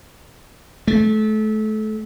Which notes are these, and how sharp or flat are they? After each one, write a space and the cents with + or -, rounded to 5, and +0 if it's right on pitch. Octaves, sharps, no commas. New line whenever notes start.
A3 -30